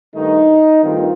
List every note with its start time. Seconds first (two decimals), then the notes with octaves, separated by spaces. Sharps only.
0.15 G2 D#3 A3 D#4
0.83 G2 D#3 A3 C4 F4